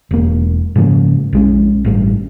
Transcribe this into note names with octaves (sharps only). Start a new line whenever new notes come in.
E1 A#3
G#2 C#3 F3 A#3
A#1 G#3 C#4
A1 G2 A3